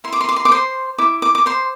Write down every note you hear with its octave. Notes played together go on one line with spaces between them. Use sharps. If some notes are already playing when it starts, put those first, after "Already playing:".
E4 C6
D6
C6
D6
C6
D6
C5 C6
E4 D6
D6
D6
C5 C6